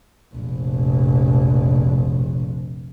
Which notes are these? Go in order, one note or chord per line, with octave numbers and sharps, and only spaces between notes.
F1 A#1